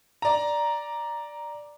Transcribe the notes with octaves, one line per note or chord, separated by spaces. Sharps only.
D5 A#5